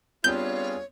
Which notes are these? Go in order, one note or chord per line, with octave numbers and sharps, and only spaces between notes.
G3 B3 C4 D4 F4 G#4 C#5 G6